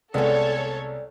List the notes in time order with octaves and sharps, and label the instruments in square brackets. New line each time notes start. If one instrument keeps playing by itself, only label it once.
[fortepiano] C2 G#3 B3 [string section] A4 C#5 [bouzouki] D5 G#5